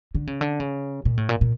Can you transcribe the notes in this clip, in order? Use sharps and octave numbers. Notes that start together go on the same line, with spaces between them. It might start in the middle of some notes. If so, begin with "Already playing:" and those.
D3
C#3
D3
C#3
A#2
A2
A#2
A#2